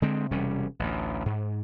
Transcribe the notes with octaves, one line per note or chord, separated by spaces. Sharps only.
D3 G#3 C4
E1 C3 G3 C#4
A1 D2
G#2